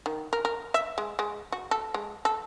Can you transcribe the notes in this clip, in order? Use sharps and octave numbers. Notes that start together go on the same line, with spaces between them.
D#3
A#4
A#4
E5
G#3
G#3
F#4
A4
G#3
A4